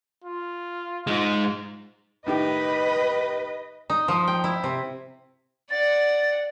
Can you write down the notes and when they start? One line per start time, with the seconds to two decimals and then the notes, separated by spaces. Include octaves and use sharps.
0.24 F4
1.07 G#3 D#4 F4
2.26 A2 D#3 G4 B4 D#5
3.90 D#4
4.08 F3
4.27 G5
4.44 E4
4.64 C3
5.71 D5 F#5 A6